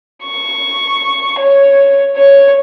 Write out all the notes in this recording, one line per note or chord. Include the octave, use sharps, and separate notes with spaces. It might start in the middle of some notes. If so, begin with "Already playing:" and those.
C#6
C#5
C#5